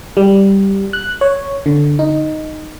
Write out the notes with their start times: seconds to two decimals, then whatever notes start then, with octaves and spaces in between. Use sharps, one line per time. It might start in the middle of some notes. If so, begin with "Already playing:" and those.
0.17 G3
0.93 F#6
1.21 C#5
1.66 D3
1.99 D#4